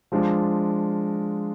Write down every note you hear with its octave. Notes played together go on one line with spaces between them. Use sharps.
F3 G#3 D4 F4